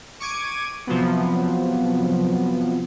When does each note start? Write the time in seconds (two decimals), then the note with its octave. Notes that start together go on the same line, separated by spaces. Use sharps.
0.20 C#6 D6 G#6 D#7
0.87 C3 F3 F#3 B3